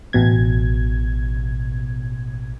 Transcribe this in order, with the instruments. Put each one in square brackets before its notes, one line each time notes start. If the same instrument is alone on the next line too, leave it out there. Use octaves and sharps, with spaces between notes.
[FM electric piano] A1 B2 G#6